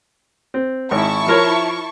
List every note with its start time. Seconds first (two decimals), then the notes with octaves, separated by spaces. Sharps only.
0.54 C4
0.91 G#1 E4 A5 C#6
1.27 F3 A#4 C#5